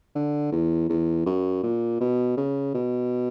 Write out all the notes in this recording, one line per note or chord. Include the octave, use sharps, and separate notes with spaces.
D3
E2
E2
F#2
A#2
B2
C#3
B2